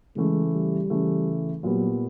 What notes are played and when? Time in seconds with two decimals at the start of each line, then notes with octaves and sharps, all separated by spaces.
0.16 C#3 E3 G#3 A3
0.53 G3
0.90 C#3 E3 A3
1.63 A#2 F#3 G3 B3